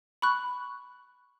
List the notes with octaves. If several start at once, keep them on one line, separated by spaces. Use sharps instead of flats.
B5 C#6 F#6